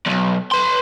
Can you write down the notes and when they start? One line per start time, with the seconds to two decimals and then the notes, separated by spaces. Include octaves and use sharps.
0.06 B1 E2
0.52 B4 C6